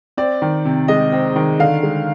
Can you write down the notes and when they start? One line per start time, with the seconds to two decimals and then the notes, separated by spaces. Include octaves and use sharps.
0.17 C4 D5
0.42 D#3
0.65 C3
0.88 G#3 D#5
1.12 C4
1.36 D#3
1.59 D3 F5
1.83 G#3